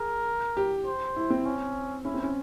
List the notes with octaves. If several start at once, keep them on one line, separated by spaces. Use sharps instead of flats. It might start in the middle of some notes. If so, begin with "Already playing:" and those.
Already playing: G#4 A#4
G4
C5
E4
C4
C#4
C#4 E4
C4
C#4